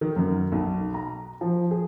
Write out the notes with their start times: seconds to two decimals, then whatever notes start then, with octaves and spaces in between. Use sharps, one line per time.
0.01 D#3
0.16 F#2
0.52 B1
0.94 A#5
1.41 F3
1.71 G#4